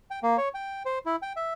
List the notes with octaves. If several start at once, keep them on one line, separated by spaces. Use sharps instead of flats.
G5
A#3
C#5
G5
C5
E4
G5
E5